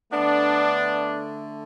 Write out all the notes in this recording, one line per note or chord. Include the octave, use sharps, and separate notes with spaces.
D3 A3 B3 D4